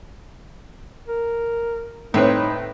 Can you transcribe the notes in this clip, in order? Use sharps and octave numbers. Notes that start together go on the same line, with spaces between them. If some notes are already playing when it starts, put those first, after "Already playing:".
A#4
A2 C4 D#4 B4 C#5